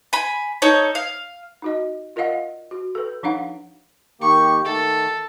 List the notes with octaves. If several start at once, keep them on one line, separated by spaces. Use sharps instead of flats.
G#5 B5
D#4 A4 C#5
F5
D#4 F#4 D#5
F4 A#4 D5 D#5 F5 F#5
F#4
A4 B4
F3 D4 D#4 F5 F#5
D#3 A#3 G4 C#6
D#3 A3 A4